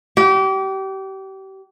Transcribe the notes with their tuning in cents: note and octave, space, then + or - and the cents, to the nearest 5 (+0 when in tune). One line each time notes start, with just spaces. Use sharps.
G4 -30